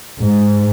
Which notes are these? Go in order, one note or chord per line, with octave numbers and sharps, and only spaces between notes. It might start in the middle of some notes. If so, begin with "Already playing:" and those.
G#2